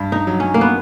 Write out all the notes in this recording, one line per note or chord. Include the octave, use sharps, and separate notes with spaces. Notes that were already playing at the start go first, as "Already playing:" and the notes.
Already playing: G2
D#4
F#3
C#4
A#3
B3